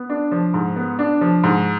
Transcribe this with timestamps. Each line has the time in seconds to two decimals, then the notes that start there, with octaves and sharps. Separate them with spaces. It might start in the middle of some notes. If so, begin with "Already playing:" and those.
Already playing: B3
0.10 D4
0.32 F3
0.54 G#2
0.76 B3
0.99 D4
1.21 F3
1.44 G#2